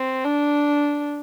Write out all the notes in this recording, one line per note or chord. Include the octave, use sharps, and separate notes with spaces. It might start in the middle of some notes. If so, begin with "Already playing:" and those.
Already playing: C4
D4